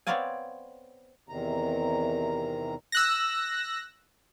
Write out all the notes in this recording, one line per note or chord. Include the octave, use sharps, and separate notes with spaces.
B3 C4 C#5 D5 F5 G#5
E2 C3 D#3 A#5
E6 F#6 A#6